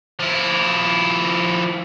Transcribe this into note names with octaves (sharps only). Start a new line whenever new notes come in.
F3 E4